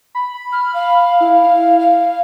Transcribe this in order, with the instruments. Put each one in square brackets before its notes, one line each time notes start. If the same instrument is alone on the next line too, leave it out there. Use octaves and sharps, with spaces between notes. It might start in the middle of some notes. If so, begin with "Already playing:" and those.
[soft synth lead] B5
[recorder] F6
F5
[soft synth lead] E4
[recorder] F5